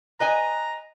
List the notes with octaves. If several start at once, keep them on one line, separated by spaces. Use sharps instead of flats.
B4 D#5 G#5 A#5